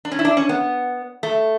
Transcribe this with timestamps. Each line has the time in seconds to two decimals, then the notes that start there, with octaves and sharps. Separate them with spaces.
0.05 D4
0.12 C#4
0.19 E4
0.25 D4
0.37 C#4
0.49 B3
1.23 A3